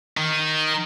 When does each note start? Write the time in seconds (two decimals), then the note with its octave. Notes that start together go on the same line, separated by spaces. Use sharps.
0.17 D#3